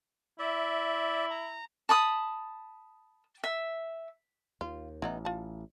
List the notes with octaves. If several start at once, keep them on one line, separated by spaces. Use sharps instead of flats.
E4 D5 E5
A#5
A5 B5 D#6
E5
D#2 F4
A1 E3 B3 D#4
F4 A5